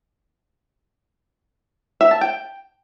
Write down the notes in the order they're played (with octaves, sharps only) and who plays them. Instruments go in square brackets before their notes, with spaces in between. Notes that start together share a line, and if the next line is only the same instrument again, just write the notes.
[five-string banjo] E5
A5
G5